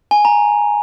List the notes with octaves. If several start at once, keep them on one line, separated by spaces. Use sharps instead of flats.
G#5
A#5